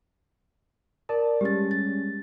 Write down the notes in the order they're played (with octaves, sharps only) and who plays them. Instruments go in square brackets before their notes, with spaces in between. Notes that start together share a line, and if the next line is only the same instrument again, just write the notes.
[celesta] A#4 [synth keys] D5 A5
[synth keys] G3 G#3 C#4 [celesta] G4 A6
[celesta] A6